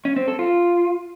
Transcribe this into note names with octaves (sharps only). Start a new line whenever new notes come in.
C#4
C4
A4
F4